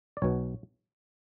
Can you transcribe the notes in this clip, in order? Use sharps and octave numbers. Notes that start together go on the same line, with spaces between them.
D5
B1 B2 C#5